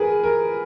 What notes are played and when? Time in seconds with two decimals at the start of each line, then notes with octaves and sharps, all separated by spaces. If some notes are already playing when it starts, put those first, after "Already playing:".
Already playing: G#4 A#4 B4
0.24 A#4